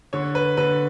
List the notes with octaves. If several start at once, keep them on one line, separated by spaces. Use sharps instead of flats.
D3 C#5
B4
D3 B4